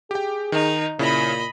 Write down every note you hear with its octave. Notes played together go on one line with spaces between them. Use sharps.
G4 G#4 G5
D#3 D#4
A#2 C#3 E4 D#5 B5